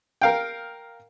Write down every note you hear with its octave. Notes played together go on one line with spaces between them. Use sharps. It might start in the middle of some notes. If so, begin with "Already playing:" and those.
A#4 F5 G5